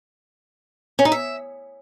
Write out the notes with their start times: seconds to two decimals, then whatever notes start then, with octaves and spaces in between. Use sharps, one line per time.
0.99 C#4
1.05 D#4
1.12 E5